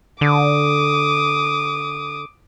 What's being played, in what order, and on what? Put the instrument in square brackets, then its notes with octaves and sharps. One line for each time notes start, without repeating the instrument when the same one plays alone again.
[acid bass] D3 [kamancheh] D6 D#6